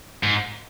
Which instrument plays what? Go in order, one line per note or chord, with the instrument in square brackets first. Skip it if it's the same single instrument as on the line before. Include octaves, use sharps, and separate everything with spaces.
[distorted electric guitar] G#2